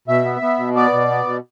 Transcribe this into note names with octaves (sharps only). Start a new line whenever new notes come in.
B2 E5
B3
B3
B2
B3 D5
B2
B3
B2